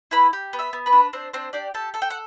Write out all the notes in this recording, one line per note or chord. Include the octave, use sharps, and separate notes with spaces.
E4 B4 B5
G4
B3
E5 E6
B3
B4 B5
D4
C4 D4 C5
C4 D4 C5
D4 G4 D5
G4 A4 A5
A4 A5
G5
F#5